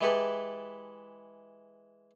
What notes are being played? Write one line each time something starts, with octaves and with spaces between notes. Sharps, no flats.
E3 G#3 E4 G4 A4 B4